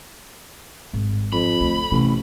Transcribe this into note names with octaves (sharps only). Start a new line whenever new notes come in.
G#1
F2 B5
D2
A1 C3